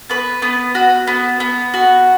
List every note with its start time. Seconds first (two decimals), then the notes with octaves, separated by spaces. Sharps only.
0.09 B3 B4
0.42 B3
0.75 F#4
1.07 B3
1.40 B3
1.74 F#4